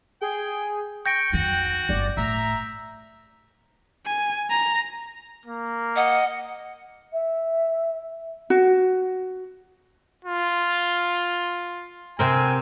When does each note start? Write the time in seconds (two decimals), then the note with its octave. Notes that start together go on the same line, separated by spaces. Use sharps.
0.22 G#4 G5
1.06 G5 C#6 G6 A#6 D7
1.33 F2 D#3 F#4
1.89 G1 F2 D5
2.17 A2 E5 A#5
4.06 G#5
4.50 A#5
5.46 A#3
5.96 D#5 F#5
7.13 E5
8.50 F#4
10.25 F4
12.19 C3 C4 A#4 G#5